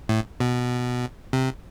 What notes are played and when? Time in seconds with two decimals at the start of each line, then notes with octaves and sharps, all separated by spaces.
0.09 A2
0.40 B2
1.33 C3